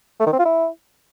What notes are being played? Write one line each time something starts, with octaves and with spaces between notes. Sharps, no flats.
A3
D#3
C4
F4
E4